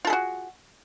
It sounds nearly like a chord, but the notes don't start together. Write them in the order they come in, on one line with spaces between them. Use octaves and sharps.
F4 A4 G#4 F#4